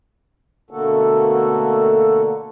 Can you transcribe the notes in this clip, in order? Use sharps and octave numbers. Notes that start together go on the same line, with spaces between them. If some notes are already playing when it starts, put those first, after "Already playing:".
B2 D3 A3 A#3 F#4 A4